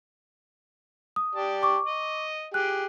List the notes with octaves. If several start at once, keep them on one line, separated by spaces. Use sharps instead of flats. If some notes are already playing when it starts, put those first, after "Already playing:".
D#6
G4 D5 A5
C#6 D6
D#5
G4 G#4 F#6